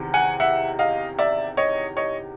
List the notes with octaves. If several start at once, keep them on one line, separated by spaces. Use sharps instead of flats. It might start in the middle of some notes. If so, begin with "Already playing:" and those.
Already playing: E2 C3 D#3
F#5 G#5
E5 F#5
D#5 F5
D5 E5
C#5 D#5
C#5 D#5